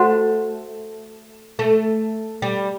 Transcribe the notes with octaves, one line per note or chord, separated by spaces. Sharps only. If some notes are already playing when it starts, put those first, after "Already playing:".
Already playing: A3 F#4 C5 F#5 C6
A3
G3